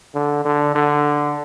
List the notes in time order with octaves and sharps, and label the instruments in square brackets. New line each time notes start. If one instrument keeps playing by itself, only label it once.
[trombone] D3
D3
D3